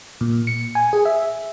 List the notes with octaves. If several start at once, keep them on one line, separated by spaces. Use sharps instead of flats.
A#2
C#7
G#5
G#4
E5